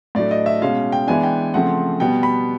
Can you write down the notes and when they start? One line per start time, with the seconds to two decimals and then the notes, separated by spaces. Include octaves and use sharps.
0.15 A2 F#3 A3 D4 D5
0.31 D#5
0.46 E5
0.62 B2 G#3 C#4 F5
0.92 G5
1.07 E3 G#3 B3 D4 G#5
1.23 G5
1.54 C#3 F3 A3 C4 F#5
2.00 B2 G3 B3 G5
2.23 B5